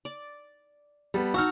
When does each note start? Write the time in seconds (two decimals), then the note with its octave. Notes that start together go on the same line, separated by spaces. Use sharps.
0.05 D5
1.14 G3 B3 A4
1.34 D#4 F#4 C#6 E6 F6